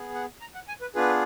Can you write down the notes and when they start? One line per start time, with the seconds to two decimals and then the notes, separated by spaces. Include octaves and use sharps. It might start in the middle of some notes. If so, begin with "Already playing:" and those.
Already playing: B3 G#4
0.15 F#5
0.41 A#5
0.55 F#5
0.68 G#5
0.81 B4
0.95 B3 D4 F4 G#4 B4